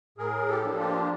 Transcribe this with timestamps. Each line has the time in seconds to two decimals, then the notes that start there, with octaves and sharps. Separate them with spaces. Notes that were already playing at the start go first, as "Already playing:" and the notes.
0.18 A2 G#4 A#4
0.48 G4 A4
0.64 F3 A#3 D4
0.78 F4 G4